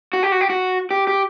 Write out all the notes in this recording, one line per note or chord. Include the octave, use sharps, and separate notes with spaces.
F#4
G4
F#4
G4
F#4
G4
G4